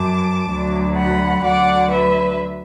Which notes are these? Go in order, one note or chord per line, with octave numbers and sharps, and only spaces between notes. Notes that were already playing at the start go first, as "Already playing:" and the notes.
Already playing: F#2 F#3 A5 D6
D2 D3 F#3
F#5 B5
D2 D3 F#3 D5 F#5
B4 E5